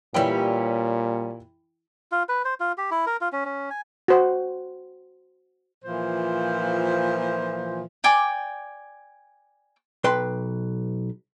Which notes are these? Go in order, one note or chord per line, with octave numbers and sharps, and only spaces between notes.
A#2 E3 G3 C#4 E4 G5
F4
B4
C5
F4
G4
E4
A#4
F4
C#4
C#4
G#5
F#4 C5 F#5
A#2 E3 F3 C5
D5 G5 G#5 D6
B1 B4 G5 C6